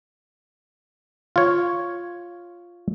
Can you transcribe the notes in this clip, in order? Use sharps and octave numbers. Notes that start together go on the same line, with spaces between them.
F4 C#5